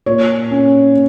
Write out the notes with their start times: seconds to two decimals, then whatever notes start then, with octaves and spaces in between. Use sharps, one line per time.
0.06 A#2 C#5
0.51 C#4